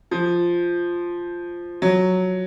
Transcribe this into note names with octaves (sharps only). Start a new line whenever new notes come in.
F3
F#3